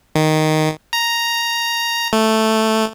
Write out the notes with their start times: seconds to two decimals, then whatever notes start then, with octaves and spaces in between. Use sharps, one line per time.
0.15 D#3
0.93 A#5
2.13 A3